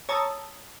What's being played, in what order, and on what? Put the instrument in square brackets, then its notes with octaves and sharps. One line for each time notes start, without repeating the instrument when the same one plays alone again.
[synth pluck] C#5 A5 A#5 D#6 E6